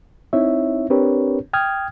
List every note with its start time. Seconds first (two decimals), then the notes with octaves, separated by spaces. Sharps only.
0.33 C4 D#4 E4 C#5 E5
0.90 C4 D4 G4 A#4 B4 C#5
1.53 G5 D#6 F6 G#6